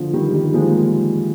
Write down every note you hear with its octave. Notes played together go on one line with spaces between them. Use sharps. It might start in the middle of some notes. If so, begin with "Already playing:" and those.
Already playing: D3 F3
D#3 G3
D#3 G3
F3 G#3
A#3